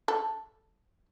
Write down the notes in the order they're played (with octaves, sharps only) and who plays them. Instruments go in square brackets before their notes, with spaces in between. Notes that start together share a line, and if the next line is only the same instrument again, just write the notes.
[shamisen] A4